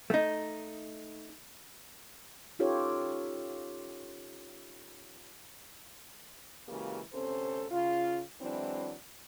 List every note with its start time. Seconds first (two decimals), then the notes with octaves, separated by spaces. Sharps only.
0.10 A3 D#4
2.59 C#4 D#4 F4 G4 A4 C#5
6.69 C#3 E3 G#3 A#3 F#4 G4
7.14 D2 C3 C4 C#4 A4 C5
7.71 C#3 F4
8.41 E3 F#3 G#3 C4 D4 E4